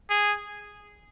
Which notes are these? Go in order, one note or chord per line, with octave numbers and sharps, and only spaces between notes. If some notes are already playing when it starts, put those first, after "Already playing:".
G#4